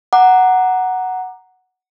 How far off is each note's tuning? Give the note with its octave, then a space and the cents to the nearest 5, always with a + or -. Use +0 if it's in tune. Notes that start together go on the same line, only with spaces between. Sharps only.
F#5 +0 A#5 +0 D6 +20